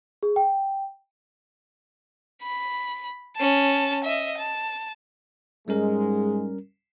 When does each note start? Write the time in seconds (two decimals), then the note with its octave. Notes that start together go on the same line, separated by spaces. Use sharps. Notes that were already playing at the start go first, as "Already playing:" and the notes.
0.23 G#4
0.36 G5
2.42 B5
3.37 C#4 A5
4.04 D#5 E5
4.38 A5
5.68 G#2 G3 G#3 C#4 A#4